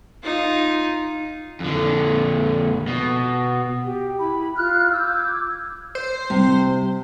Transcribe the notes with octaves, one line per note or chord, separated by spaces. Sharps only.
D#4 F4
F2 D3
B2
G4
E4 B5
F4 F6 F#6
D6 E6 G6 G#6
C5
C3 G3 E4